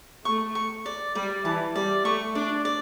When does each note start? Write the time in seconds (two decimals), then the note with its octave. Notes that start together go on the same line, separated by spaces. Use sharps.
0.25 A3 C#6
0.55 C#6
0.86 D5
1.15 G3 D5
1.45 E3 A5
1.75 G3 D5
2.05 A3 C#6
2.35 D4 D5
2.65 D5